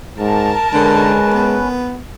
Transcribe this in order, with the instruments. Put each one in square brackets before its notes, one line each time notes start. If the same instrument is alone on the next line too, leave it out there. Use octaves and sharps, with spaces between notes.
[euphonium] G#2 [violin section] A#4 A5
[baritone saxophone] D3 [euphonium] G#3 [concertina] C#4 B4
[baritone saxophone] B3